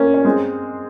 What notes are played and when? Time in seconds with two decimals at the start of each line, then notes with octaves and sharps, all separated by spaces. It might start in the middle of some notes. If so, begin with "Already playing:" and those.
Already playing: A#3 C#4
0.14 C#4
0.24 G#3 C4